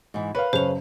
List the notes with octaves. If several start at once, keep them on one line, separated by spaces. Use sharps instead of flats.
G#2 E3
A#4 B4 C#5 F5
F#1 G#4 C5 C#5 F7